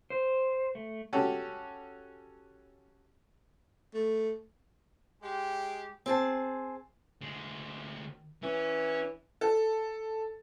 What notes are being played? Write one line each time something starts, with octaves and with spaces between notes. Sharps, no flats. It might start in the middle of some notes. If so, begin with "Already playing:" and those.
C5
A3
C#4 F#4 G4 A4
A3
G#3 G4
C4 G#4 A5
D2 G#3
E3 C#4
A4